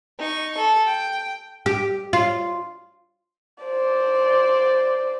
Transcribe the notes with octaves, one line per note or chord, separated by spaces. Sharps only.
D#4 C#6
A4
G5
G4
F4
C5 D5